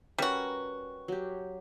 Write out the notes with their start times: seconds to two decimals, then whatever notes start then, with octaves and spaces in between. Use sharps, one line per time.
0.18 G3 C#4 F#4 A#4 B4
1.08 F#3 G4